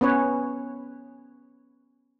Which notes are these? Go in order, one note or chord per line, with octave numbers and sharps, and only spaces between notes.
B3 C#4 B4 C#5